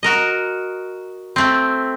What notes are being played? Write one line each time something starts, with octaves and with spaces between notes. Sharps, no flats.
F#4 A#4 D#5
A3 C4